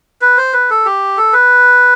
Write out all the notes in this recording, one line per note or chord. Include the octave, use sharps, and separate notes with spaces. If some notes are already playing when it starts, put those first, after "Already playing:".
B4
C5
B4
A4
G4
A4
B4